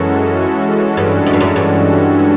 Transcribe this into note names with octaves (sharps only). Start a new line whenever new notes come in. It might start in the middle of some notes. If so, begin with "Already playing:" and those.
Already playing: F#2 E3 G#3 C#4 F#4 A4
G2
F#2
G2
F#2
G2